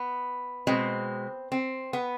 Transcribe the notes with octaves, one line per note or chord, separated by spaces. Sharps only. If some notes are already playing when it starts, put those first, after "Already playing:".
Already playing: B3
B2 G#3 C4
C4
B3